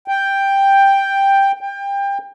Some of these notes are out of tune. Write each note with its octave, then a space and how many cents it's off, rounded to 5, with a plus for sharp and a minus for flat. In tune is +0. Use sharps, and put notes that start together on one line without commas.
G5 +5
G5 +25